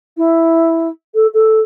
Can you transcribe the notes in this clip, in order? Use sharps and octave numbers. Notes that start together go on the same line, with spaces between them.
E4
A4
A4